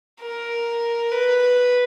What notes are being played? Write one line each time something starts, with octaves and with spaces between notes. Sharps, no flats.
A#4
B4